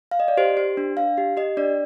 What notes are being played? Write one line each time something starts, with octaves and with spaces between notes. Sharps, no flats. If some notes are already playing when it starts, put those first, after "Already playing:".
F5
D#5
D5
G4 C5
G4 C5
D4
D4 F5
G4
G4 D#5
D4 D5